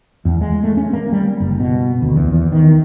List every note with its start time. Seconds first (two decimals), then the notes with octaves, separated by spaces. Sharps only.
0.25 E2
0.41 G#3
0.64 A3
0.77 C#4
0.93 A#3
1.12 G3
1.40 F#1
1.60 B2
2.02 D2
2.16 E2
2.33 E2
2.52 D#3